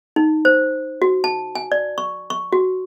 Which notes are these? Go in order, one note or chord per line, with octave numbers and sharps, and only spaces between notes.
D#4
C5
F#4
A5
G#5
D5
C#6
C#6
F#4